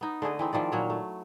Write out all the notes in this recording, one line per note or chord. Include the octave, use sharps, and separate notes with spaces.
B3 D#4
D3 A3 G#4 D#5
E3 C4 D#4
D#3 F3 E4 D5
A#2 F#3 C#5
A3